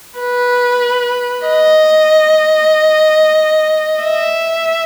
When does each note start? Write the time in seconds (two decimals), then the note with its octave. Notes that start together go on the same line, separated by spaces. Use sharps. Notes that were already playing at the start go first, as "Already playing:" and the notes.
0.19 B4
1.47 D#5
4.04 E5